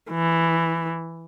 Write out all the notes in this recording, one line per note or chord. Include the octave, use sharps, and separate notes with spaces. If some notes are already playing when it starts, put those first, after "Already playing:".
E3